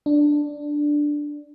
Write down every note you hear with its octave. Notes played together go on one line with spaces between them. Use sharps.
D4